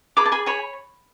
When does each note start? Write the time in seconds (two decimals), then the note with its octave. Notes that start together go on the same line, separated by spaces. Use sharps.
0.17 G#4 B5 D6
0.26 A5
0.32 G#4 G#5 B5
0.46 C#5 G#5 B5